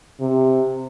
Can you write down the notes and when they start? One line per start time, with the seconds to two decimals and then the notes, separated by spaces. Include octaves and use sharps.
0.21 C3